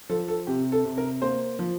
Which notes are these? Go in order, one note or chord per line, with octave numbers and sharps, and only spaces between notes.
F3 A4
A4
C3 G4
A4
C3
A#4
A#3 C5
F3